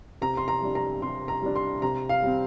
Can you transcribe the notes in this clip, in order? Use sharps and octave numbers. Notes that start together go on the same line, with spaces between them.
C3 A#5
C6
A#5
G3 D4
A#5
C3 C6
A#5
G3 D4
C6
C3 A#5
F5
G3 C4